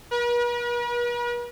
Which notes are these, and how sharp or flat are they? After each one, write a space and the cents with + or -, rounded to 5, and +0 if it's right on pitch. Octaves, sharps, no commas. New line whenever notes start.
B4 -45